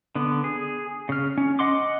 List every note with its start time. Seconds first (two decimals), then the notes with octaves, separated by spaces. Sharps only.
0.15 D3 B3
0.44 G#4
1.09 C#3 F6
1.38 C#4
1.59 D#5 F#5 C6 D6